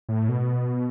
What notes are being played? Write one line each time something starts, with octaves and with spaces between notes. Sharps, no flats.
A2
B2